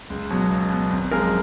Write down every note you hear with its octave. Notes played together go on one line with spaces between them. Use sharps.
C#2
B2 F#3
C#2
B2 F#3
G#1
F#2 F3 G#3 A#4